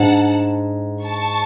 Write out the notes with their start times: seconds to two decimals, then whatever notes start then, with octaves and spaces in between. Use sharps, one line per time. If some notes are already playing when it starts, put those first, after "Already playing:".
Already playing: G#2 G#3 D4 F#5 A5
1.04 A5 C#6